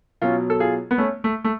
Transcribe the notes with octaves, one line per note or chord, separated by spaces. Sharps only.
B2 F#3 C#4 F4
A4
F4 G#4
B3
A3 C#4
A3
A3